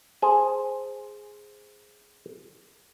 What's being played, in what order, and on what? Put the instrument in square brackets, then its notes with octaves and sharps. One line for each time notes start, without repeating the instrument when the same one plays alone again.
[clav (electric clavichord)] G#4 C5 G#5